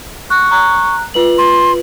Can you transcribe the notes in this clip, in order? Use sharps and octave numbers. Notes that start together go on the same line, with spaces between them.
C#6 F#6
A#5 F#6
F4 B4 F#7
C6